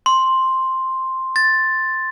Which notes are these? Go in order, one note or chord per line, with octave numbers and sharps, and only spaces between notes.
C6
A6